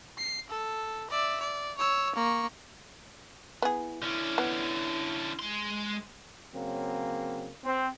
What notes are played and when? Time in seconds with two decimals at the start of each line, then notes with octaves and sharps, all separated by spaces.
0.18 C7
0.50 A4
1.10 D5 E5
1.40 D5
1.78 C#5 E6
2.16 A#3 C#6
3.62 B3 E4 G#4
4.02 D3 C#4 E4
4.38 B3
5.39 G#3 C6
6.55 C#3 F#3 A#3 C4
7.64 C4